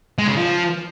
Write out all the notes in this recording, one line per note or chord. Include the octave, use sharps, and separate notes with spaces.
G#3
C#3
F3